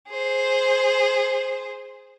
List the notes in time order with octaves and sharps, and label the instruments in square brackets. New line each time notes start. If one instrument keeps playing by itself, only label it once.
[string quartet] G#4 C5